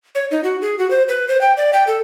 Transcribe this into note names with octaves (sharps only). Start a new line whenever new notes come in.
C#5
D#4
F#4
G#4
F#4
C5
B4
C5
G5
D5
G5
A4